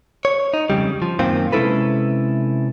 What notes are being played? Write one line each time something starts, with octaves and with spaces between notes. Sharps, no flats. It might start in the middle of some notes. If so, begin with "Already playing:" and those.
C#5
D#4
F2 A2 C#3 G3
F3
F#2 A#2 D#3 C4 F4
C3 G#3 C#4 E4 A4 B4